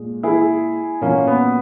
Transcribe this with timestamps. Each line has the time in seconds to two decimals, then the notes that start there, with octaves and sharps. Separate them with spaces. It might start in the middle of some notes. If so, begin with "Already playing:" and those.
Already playing: A#2 G#3
0.23 E4 G#4
1.01 A#2 F#3 A#3 C#4
1.27 B3